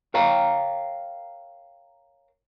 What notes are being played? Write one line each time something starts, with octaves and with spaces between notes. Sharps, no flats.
A#4 C#5 F5 G5 A#5